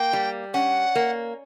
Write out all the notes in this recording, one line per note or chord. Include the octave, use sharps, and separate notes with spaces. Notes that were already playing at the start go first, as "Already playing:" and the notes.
Already playing: A#3 G5
G3
C#4 F#5
A#3